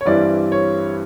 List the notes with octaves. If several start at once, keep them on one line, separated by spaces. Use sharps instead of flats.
C#5
G2 E3 G3 C4 E4 D5
C#5